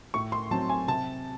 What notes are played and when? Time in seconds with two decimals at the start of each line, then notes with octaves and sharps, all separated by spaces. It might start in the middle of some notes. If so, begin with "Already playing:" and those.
0.14 A2 C#6
0.32 C6
0.51 F#3 C4 A5
0.70 G#5
0.88 C3 A5